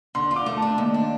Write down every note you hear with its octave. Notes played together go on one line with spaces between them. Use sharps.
D3 C6
F4
D6
A3
D4 A5
D#2
D4